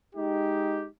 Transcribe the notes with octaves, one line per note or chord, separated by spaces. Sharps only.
G#3 D#4 G4